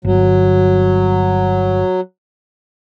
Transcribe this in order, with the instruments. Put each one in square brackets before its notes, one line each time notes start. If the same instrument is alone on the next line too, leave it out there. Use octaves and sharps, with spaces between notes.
[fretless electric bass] G1 [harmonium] F#3